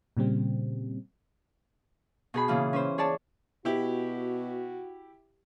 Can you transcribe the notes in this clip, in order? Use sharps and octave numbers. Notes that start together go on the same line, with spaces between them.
A#2 C#3 G3 C4
B2 G#4 B5
A#2 C#3 E3
C#4 B4 C5
G#4 C#5 D5 A5
B2 E4 F#4 G4